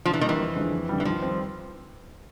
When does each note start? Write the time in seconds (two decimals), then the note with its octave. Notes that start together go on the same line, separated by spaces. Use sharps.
0.05 D3 F3
0.13 E3
0.21 D#3 G3 A#3
0.29 E3
0.39 F2
0.56 D3 F3 G#3
0.72 F2
0.89 D3 G3
1.00 E3
1.05 D#3 F3
1.22 G3 C4